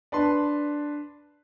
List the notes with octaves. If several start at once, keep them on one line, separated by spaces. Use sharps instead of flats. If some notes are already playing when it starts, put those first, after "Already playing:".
D4 B4 A5 C6